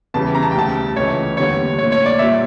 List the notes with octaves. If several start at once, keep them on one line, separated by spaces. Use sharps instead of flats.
E2 C#3 E3 G3 A5
A#5
A5
G5
D2 C#3 G3 A5
C#2 C#3 E3 A3 C#5
E2 D3 G3 A#3 C#5
A#2 A3 C#5
C#5
D5
A#2 G3 A#3 E5